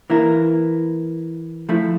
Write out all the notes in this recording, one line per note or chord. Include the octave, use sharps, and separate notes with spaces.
E3 A#3 E4 A#4
F3 A3 E4